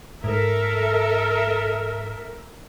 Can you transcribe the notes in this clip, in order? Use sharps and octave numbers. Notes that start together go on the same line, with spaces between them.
G#2 A4 A#4 E5